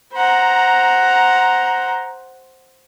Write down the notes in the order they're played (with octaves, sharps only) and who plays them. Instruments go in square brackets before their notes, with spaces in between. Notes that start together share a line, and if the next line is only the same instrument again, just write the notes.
[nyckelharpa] C5 F#5 [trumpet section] A#5